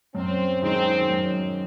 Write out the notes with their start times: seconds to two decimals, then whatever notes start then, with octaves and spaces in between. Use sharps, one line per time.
0.14 F#2 C4
0.62 D#3 G#3 C4 D#4 G#4
1.09 F#2